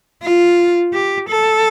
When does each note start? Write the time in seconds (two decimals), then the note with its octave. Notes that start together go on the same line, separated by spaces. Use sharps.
0.22 F4
0.93 G4
1.29 A4